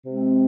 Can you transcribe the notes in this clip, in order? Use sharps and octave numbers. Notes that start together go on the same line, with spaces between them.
C3 G#3 C4